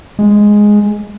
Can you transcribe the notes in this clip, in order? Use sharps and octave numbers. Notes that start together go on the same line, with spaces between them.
G#3